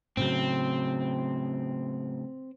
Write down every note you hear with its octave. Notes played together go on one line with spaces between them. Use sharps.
A2 C#3 F#3 C4